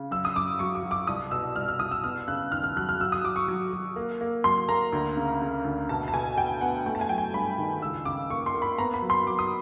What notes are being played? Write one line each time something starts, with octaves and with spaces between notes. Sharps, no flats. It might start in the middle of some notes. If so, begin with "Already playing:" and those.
Already playing: C#3
F#2 E6
D#6
F#2 D6
F#3 C#6
D6
F#3
D6
C2 D#6
B2 E6
C2 F6
F6
C2 D#6
E6
B3 F6
C#3 F#6
D#2 F6
F6
F#3 F#6
F6
F#3 E6
D#6
F#3 D6
C#6
F#3
F#3
A#3
A#3
F#3 C6
A#3 A#5
D2
C#3
C#3
D2
B2 A5
A5
B2 G#5
B2 G5
B3 F#5
A3 G5
A5
G#5
F#3 G5
G#5
G2 B5
D#3
C#2 E6
C#3 D6
A#3 C#6
C6
A#3
B5
B3 A#5
B5
F#3
C6
F#3 D6
D#6